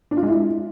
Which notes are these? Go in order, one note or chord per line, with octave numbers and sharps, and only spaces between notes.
D4
F4
G#3
E4